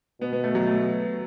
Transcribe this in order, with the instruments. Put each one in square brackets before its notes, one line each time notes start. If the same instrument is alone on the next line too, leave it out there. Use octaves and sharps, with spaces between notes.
[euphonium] B2 [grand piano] B3
[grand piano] B3
A3
F#3
A3